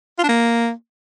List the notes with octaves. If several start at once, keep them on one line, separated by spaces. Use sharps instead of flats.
F4
D4
A#3